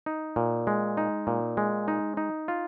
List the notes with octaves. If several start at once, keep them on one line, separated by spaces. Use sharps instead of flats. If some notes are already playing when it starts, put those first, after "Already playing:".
D#4
A#2
G#3
D#4
A#2
G#3
D#4
D#4
F4